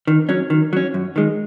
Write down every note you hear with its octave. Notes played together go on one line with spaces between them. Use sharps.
D#3
F#3 C#4
D#3
F#3 C#4
F#2
D#3 G#3